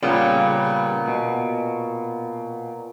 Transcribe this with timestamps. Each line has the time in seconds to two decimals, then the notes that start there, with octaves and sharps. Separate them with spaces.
0.03 A#2 C#3 G3 B3
1.08 B2